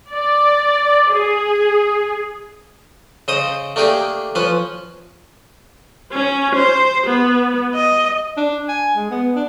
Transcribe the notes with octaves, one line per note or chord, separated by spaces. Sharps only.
D5
G#4
C#3 C5 D#5 D#6
A3 A#3 D4 G4 G#4
F3 C#4 B4
C#4
C5
B3
D#5
D4
G#5
G#3
B3
D4